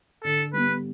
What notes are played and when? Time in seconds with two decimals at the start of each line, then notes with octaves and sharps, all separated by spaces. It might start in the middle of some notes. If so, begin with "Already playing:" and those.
0.24 D3 A4
0.53 G3 B3 B4